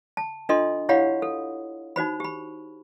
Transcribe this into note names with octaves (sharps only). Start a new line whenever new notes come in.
A5
D4 F4 A4 D#5 C6
E4 G4 C#5 F5 F#5 B5
A4
D#4 F#4 C5 B5
G4 B5